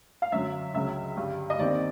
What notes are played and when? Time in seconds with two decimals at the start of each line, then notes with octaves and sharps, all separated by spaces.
0.22 F5
0.32 F#2 D3 F#3 E5
0.74 C#2 C#3 F#3 E5
1.16 G2 D3 G3
1.50 D#5
1.59 D#2 D#3 G3 C4 D5